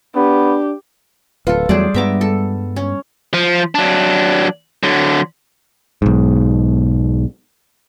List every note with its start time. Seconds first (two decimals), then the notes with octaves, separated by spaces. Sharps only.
0.16 B3 D4 G4
1.47 D1 F4 A4 B4 F5
1.69 E2 F#3 G3 A3 G#4 C5 D5
1.94 G2 G#3 B3 E5 A#5 D6
2.21 A4
2.76 C#4
3.34 F3
3.75 F#3 D4
4.83 D3 F#3
6.02 B1 G#2